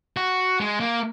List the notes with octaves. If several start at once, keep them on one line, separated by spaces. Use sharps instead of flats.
F#4
G#3
A#3